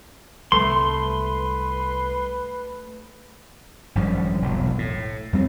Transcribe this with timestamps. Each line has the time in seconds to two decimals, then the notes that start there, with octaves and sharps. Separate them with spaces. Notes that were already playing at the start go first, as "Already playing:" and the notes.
0.52 C2 A3 A#3 B4 C6
3.95 G#1 F#2 F3 G3
4.42 E1 B1 F2
4.78 A2
5.33 F2 G3 C4